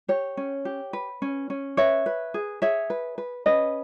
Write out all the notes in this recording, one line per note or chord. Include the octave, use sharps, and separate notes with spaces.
G4 C#5
C#4
G4
B4
C#4
C#4
B4 C#5 E5
B4
G#4
G#4 C#5 E5
B4
B4
C#4 B4 D#5